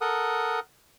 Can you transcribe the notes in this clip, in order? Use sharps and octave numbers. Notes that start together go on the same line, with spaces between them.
A4 A#4 F#5 D#6